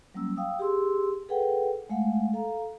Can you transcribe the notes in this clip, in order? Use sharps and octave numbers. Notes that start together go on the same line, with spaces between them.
F#3 G3 A#3 C#4 E6
F5 G5 D#6 E6
G4 G#4 C6 E6
G#4 A4 B4 F#5 G5
G#3 A3 F5 F#5
A4 F5 A#5